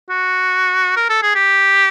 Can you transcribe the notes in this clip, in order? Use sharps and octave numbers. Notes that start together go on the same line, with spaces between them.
F#4
A#4
A4
G#4
G4